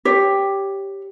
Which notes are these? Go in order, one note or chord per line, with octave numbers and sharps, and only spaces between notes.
G4 C#5